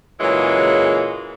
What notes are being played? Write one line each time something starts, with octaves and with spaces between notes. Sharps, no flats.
A#2 C#3 E3 F#3 G#3